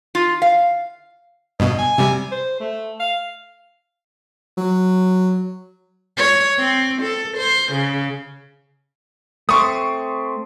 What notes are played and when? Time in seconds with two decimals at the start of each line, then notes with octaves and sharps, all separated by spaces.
0.15 F4
0.42 F5
1.60 G2 B2 D#5
1.78 G#5
1.98 C3 G3
2.31 C5
2.60 A3
3.00 F5
4.57 F#3
6.17 C#5
6.58 C4
7.02 A4
7.37 C5
7.73 C#3
9.49 A3 C4 C6 C#6 D#6